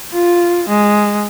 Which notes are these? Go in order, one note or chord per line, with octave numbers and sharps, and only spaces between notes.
F4
G#3